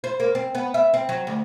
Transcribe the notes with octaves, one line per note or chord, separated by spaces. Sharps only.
C5
A#3
C4
B3
E5
C4
F#3
D2